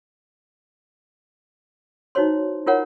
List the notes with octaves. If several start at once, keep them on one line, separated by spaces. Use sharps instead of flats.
D#4 E4 F#4 C5 C#5 C6
E4 F4 A#4 C#5 F#5